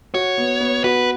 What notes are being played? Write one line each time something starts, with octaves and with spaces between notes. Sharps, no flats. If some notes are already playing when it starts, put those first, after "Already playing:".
F#4 C#5
B3
B3
F#4 B4